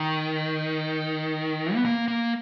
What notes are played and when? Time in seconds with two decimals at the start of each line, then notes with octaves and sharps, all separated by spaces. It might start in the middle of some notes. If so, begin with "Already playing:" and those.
Already playing: D#3
1.75 B3
1.85 A#3
2.08 A#3